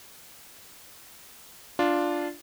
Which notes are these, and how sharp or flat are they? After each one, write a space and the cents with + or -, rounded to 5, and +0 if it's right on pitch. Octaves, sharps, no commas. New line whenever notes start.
D4 +0 F4 +0